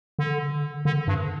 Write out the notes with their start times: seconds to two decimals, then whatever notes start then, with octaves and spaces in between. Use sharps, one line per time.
0.19 D3
0.85 D3
1.07 G2